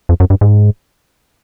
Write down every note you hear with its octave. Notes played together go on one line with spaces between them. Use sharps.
F2
F#2
G2
G#2